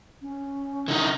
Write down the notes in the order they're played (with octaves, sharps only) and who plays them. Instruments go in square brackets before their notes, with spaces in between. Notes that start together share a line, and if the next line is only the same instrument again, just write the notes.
[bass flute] C#4
[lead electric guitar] D3 D#4